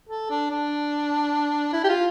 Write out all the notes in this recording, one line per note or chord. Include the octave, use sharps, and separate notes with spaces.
A4
D4
D4
E4
G4
F4